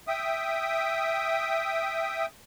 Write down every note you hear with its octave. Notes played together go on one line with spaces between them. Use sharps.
E5 G5 D#6